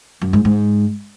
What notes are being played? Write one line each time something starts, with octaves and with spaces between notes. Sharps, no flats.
F#2
G#2
G#2